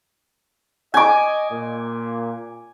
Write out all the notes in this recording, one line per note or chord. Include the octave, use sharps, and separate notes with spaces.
D#5 G#5 D6
A#2